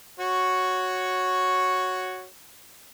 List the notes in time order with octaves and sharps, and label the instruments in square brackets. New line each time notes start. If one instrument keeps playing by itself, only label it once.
[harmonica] F#4 C#5